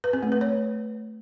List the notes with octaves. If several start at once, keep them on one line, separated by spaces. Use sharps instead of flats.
B4
C4
A3
B4
C#5